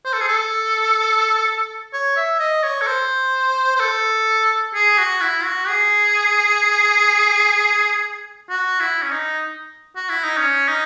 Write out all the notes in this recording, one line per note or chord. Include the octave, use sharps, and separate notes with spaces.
C5
A4
G#4
A4
C#5
E5
D#5
C#5
A4
C5
C5
A4
G#4
F#4
E4
F#4
G#4
F#4
E4
C#4
D#4
F#4
E4
D#4
C#4
D#4